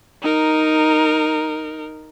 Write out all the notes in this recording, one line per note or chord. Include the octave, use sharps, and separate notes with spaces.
D#4 A#4